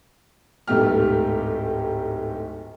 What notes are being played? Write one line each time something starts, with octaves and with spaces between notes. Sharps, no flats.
D1 G#2 A3 G4 F6